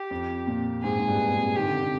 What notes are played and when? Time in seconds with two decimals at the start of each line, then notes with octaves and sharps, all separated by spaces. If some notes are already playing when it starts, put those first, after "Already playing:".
Already playing: G4
0.11 F2
0.47 A#2
0.83 G#2 G#4
0.99 G#2
1.08 G2
1.32 A#2
1.56 D#3 G4
1.65 D3
1.74 C3
1.83 D3